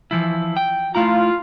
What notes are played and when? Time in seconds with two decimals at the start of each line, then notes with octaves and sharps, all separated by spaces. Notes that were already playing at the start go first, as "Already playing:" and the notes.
0.11 E3 F3 E4
0.57 G5
0.95 A3 E4 F4 A#5